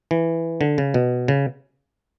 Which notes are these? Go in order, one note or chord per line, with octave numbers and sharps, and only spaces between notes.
E3
D3
C#3
B2
C#3